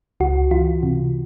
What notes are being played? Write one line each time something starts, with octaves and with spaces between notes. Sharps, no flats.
C#2 F#4
E3 F4
C3